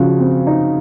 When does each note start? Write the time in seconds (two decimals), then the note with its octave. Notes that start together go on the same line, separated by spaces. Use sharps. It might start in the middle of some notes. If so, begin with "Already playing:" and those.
Already playing: C#3 F3 F#4
0.19 C4
0.47 D#4